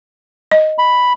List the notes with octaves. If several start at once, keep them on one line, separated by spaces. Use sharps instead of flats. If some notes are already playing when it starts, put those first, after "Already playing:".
D#5
B5